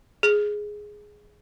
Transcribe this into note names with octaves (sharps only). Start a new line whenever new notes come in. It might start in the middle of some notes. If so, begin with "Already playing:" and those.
G#4